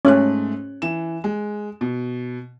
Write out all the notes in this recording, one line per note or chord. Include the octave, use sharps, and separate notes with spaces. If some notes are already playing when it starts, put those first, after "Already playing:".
G#2 A3 C#4 F#6
E3 E7
G#3
B2